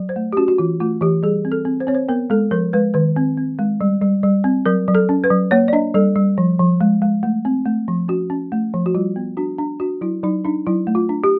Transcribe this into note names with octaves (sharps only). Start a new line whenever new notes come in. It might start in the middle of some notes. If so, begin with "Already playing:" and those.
Already playing: F#3
C5
A3
G4
C#4 F#4
F#4
E3 F4
A3 F4
E3 G4
G3 G#4
C4
A4
C4
C5
C4 C#5
C5
B3 A#4
G#3 A4
F3 A#4
G#3 B4
D#3 B4
C4
C4
G#3
G3
G3
G3
C4
F#3 A#4
F#3
A4
C#4
B4
F#3
A#3 C#5
D5
D4 D#5
G3 A4
G3
F3
F3
G#3
G#3
A3
C4
A3
F3
C#4 F#4
C#4
A3
F3
F#4
G3 F4
B3
D4 F#4
D4
D4 F#4
F#3 E4
F#3 D#4
D4 D#4
F#3 E4
A3
F4
D4
G4